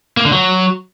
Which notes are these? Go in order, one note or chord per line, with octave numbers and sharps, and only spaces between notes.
A#3
D3
F#3